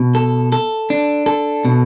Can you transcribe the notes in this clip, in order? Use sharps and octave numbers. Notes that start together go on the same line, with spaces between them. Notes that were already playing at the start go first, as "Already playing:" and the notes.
Already playing: B2
A4
A4
D4
A4
B2